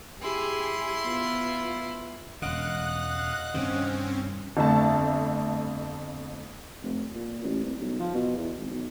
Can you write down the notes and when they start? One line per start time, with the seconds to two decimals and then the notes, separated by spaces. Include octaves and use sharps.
0.21 E4 G4 G#4 C6
1.04 B3 F4
2.42 E1 C#3 D#5 F5 F#5 F#6
3.54 G2 C3 D#3 C4 C#4
4.57 G1 F2 A3 E5 A5
6.83 F1
7.15 A#2
7.43 A1
7.63 C2
7.81 B1
8.00 F3
8.15 B2
8.37 E2
8.58 G#1
8.71 B1